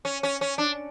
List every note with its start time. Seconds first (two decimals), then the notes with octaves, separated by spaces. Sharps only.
0.05 C#4
0.23 C#4
0.41 C#4
0.58 D4